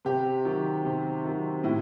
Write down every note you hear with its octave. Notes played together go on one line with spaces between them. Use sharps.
C3 G4
D#3 F#3
C3
D#3 F#3
A2 E4